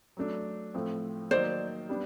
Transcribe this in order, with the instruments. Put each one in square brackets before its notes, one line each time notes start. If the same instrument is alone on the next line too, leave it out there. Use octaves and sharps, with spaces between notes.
[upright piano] F#3 A3 D4
A2 F3 A3 C4
[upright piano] D#3 F#3 A#3 D#4 [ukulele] C5 D5
[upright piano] G3 B3 D4